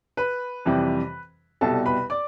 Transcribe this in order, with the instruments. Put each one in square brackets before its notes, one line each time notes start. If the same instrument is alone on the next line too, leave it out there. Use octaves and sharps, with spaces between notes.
[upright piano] B4 B5
F2 C3 E3 G3
C2 B2 G3 A4 A5
B4 B5
D5 D6